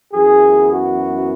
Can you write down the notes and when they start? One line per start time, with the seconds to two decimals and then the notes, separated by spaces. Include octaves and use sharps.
0.14 F#2 E3 B3 G#4
0.72 F#4